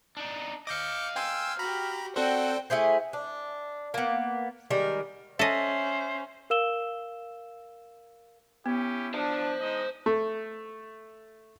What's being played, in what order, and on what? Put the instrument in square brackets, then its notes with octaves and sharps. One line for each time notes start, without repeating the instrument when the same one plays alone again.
[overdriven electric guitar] D4 D#4
[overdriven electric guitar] D#5 F5 [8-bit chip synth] D6 G6 C#7
[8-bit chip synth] G5 G#5 C6 [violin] E6
[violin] F#4 G4 [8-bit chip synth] A#5 B5
[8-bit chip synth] C4 A4 C5 [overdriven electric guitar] F#4 [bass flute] D5 [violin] G5
[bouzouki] A3 E4 G#4 C5
D4
A#3 B3
D#3 G3 G#3 A#4
[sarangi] C#4 [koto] A4 D#5 [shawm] C5 [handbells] E5
[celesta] A#4 F5 E6 E7 G7
[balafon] B3 [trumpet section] C#4 E4 G4
[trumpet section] D4 [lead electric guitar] C5 A5
[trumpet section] G#3 D#4 D#5
[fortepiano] A3